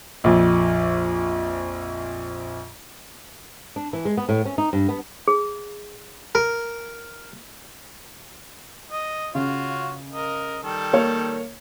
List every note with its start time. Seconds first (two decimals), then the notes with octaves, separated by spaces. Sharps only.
0.24 A#1 F2
3.76 D4
3.93 E3
4.05 G#3
4.17 B3
4.29 A2
4.45 C#4
4.58 D#4
4.73 G2
4.89 B3
5.27 G#4
6.35 A#4
8.91 D#5
9.35 C#3 F4 F#4 C#5
10.12 A#4 D#5
10.63 D#3 G3 A4
10.93 A#3 C#5